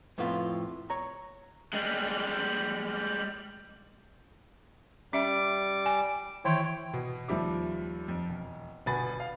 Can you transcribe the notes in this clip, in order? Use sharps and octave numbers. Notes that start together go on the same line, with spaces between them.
F2 A2 B3 C4 F4
C#5 A#5
G3 G#3
G3 C#4 E5 D6
G#5
D#3 E3 E4 C#5 G5
B2
D#2 F3 G3 E5 D6
F2
E1
G1 B2 B4 G#5 A6
F5